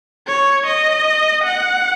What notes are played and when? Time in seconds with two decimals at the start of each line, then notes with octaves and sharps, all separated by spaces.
0.27 C#5
0.66 D#5
1.44 F#5